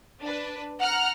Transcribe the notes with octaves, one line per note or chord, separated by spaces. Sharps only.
D4 B4
F#5 A#5 F6 F#6